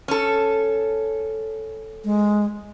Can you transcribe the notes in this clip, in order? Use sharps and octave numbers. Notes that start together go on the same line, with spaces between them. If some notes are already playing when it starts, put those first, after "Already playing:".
C#4 A4
G#3